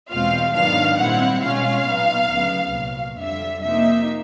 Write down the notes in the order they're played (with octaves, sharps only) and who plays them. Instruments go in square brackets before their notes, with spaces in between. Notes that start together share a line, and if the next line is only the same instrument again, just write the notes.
[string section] E2 B2 G#3 C4 F4 F5
G#2 D#3 F#3 B3 D4 F5
A#2 G3 C4 E4 F#5
B2 G#3 C#4 F4 F5
A#2 F#3 B3 D#4
D2 C#3 F#3 B3
C2 A#2 F#3
F2 D3 G3 E5
C3 F3 A#3 D#4 E5